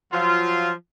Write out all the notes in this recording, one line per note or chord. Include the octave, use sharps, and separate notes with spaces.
F3 F#3 F4